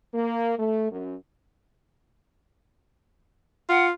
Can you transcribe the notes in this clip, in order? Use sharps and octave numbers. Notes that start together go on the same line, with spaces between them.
A#3
A3
F#2
F4 F#5